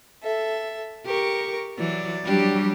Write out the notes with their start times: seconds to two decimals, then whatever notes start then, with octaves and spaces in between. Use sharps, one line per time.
0.23 A4 E5
1.06 G4 A#4 C#6
1.77 E3 F#3 D5
2.25 F#3 G3 D4 G4